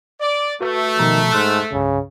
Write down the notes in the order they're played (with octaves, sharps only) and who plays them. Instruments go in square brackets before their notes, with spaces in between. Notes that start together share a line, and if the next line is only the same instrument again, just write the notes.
[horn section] D5
[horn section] A3 [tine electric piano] F#4 B4
[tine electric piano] B2 F3 A#5 [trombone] D#3
[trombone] G#2 [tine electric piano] C6 F6 F#6
[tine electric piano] C2 G2 [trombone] C#3